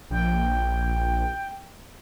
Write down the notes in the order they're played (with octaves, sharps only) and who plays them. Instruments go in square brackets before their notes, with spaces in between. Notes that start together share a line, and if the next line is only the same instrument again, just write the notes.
[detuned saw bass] A#1 [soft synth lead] G5